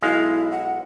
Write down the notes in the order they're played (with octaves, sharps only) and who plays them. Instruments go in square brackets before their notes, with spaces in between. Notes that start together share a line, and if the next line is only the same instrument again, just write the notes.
[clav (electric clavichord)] B1 G#3 F5 [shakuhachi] E4
[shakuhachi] F#5